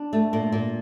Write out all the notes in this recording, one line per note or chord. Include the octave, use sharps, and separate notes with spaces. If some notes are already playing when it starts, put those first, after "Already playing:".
Already playing: D4
A3
A#2
A#2